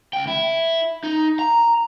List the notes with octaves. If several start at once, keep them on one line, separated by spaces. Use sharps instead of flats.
C#2 G5
E4
D#4
A#5